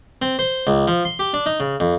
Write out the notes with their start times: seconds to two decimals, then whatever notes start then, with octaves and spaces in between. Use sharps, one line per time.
0.22 C4
0.39 C5
0.67 C#2
0.88 F3
1.05 C6
1.19 G4
1.34 D4
1.46 D#4
1.60 C#3
1.80 F2